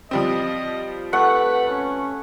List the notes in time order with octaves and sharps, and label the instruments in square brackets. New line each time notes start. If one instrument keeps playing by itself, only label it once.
[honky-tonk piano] F3 G3 C4 [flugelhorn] D#5
[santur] A3 F#5 [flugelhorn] B4
[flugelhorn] C#4